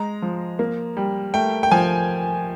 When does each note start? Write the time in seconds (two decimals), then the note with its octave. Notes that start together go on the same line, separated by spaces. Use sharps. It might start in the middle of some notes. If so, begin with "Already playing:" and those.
Already playing: G#3 A#5
0.22 F3
0.59 A#3
0.97 G3
1.34 A3 G5
1.63 G5
1.71 F3 G#5